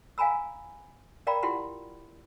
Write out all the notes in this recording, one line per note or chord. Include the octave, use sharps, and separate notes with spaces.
F5 F#5 G#5 A#5 B5 E6
A#4 D5 F5 G5 A#5 B5
E4 F4 G4 F#5 B5 C6